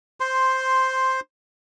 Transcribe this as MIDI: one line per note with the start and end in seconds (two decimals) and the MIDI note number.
0.20 1.20 72
0.20 1.20 84